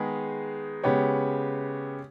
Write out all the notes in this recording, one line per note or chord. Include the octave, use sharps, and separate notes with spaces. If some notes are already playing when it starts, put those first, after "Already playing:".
Already playing: D#3 G#3 B3 D#4 G#4
C#3 G#3 B3 G4 C#5